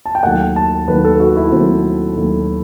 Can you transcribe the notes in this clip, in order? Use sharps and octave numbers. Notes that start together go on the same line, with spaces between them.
A5
G5
D#2 D#3 F#3 A3 F#5
A5
D#2 D#3 F#3 A3 B4
A4
F#4
E4
D#2 D#3 F#3 A3 C4
D#2 D#3 F#3 A3